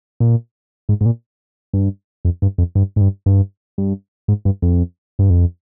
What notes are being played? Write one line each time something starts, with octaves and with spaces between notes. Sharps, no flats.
A#2
G#2
G#2
A#2
G2
F2
G2
F2
G2
G#2
G2
G2
G2
G#2
G2
F2
G2
F2